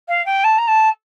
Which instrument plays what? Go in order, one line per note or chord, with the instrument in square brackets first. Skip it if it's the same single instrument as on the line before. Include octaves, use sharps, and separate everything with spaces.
[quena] F5
G5
A5
A#5
A5